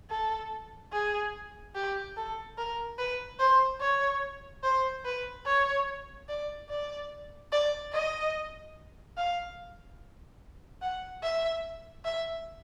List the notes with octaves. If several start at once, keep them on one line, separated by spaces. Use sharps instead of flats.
A4
G#4
G4
A4
A#4
B4
C5
C#5
C5
B4
C#5
D5
D5
D5
D#5
F5
F#5
E5
E5